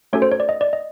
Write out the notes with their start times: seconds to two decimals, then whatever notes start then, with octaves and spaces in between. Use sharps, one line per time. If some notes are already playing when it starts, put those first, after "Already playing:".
0.13 A3 C#4 F#4 A4 C#5
0.22 C5
0.32 C#5
0.40 D5
0.49 D#5
0.61 D5
0.73 D#5